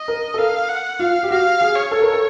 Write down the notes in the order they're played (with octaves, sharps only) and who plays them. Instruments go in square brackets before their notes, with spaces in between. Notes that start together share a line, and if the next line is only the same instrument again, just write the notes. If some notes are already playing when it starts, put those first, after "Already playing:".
Already playing: [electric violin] D#5
[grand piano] A#4
A4
[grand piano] A#4 [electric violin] F5
[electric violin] F#5
[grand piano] F4 [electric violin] F5
[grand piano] G4
[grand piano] F#4 [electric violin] F5
[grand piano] G#4
[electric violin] C#5
[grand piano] A4
A#4
A4